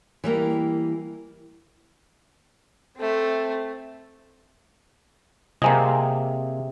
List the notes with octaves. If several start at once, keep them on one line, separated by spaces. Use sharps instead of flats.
E3 G3 A#3
A3 C4
C3 A#3 C4 G#4 D#5 G#5 A#5